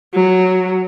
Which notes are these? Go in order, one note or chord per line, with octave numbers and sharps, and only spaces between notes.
F#3